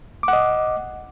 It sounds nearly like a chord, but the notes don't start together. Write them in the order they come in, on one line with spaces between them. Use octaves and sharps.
D6 F#5 D#5